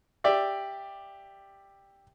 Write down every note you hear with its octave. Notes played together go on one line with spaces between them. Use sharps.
G4 D5 E5